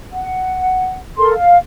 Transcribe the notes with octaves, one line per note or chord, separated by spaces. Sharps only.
F#5
A4 A#4 C6
F5